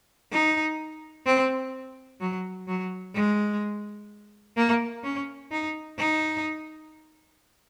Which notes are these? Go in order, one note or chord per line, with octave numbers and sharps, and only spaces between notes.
D#4
C4
F#3
F#3
G#3
A#3
C#4
D#4
D#4